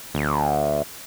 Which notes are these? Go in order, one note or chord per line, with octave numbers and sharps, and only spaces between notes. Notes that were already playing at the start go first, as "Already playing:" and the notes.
D2